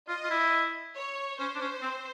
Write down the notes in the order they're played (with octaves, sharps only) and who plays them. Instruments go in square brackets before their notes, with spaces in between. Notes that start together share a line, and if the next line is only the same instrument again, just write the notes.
[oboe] F4 [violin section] D#5
[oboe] F4
E4
[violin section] C#5
[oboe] C#4 [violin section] C5
[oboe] D4
C#4
C4